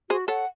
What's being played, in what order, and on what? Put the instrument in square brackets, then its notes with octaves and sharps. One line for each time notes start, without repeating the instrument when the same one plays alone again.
[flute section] F#4 [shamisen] G#4 C5
[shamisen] A4 C#5 [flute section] F#5